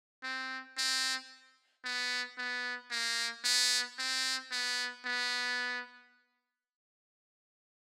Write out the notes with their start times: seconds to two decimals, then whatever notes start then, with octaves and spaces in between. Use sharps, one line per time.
0.23 C4
0.77 C4
1.84 B3
2.38 B3
2.91 A#3
3.44 B3
3.99 C4
4.52 B3
5.05 B3